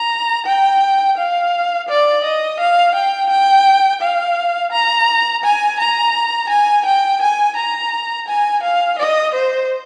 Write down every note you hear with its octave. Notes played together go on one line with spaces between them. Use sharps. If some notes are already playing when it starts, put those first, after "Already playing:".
Already playing: A#5
G5
F5
D5
D#5
F5
G5
G5
F5
A#5
G#5
A#5
G#5
G5
G#5
A#5
G#5
F5
D#5
C5